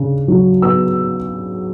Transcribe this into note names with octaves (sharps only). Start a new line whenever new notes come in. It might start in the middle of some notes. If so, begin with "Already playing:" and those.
Already playing: C#3 D4
F#3
B3 E6